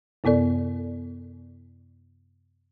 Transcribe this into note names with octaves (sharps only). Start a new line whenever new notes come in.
F#2 C3 B3 A4 D5